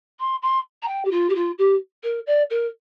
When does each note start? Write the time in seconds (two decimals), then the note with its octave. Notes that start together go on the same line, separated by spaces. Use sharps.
0.20 C6
0.42 C6
0.82 A#5
0.88 G5
1.05 G4
1.11 F4
1.29 G4
1.35 F4
1.58 G4
2.03 A#4
2.27 D5
2.50 A#4